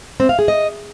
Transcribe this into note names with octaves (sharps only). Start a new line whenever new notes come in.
C4
F5
G#4
D#5